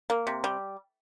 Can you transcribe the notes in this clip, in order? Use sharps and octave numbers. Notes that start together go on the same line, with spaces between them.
A#3
C3
G3